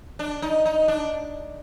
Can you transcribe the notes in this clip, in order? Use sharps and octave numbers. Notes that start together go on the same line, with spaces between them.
D4
D#4
D#4
D4